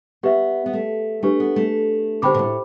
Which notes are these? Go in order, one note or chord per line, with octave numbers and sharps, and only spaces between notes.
B3 G4 B4 E5
B3
A3
A3 D4 G4 B4
B3
A3
D3 G4 C5 G5 B5 D6
B2
A2